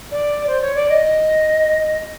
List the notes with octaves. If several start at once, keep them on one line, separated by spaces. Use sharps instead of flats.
D5
C5
C#5
D5
D#5